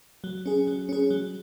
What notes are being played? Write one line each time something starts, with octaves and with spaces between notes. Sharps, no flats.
F#3
C#4 G#4
F#3
C#4 G#4
F#3